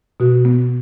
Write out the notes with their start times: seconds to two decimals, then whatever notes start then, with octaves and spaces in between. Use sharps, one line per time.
0.20 B2 F#4
0.45 B3